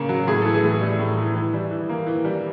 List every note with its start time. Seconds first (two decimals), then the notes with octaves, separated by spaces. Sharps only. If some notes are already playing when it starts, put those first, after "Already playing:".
Already playing: C#3 A#3 C#4
0.09 F#3
0.27 A2 G#4
0.42 E3 A4
0.54 G#4
0.64 A2
0.81 G3
0.99 A2
1.17 E3
1.35 E3
1.54 G3
1.71 E3
1.89 A#3
2.06 E3
2.25 G3